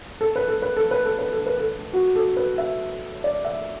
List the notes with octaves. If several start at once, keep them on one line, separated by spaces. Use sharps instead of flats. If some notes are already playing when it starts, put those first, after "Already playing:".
A4
B4
A4
B4
A4
B4
A4
B4
A4
B4
A4
F#4
A4
B4
E5
D5
E5